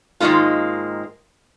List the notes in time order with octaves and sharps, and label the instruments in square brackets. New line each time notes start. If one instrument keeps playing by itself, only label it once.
[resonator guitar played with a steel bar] G#2 D#3 G3 G#3 A#3 F4